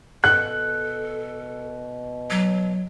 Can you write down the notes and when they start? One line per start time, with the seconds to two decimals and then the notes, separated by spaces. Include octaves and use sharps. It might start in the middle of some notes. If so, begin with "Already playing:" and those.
0.24 B2 A4 F#6
2.30 F#3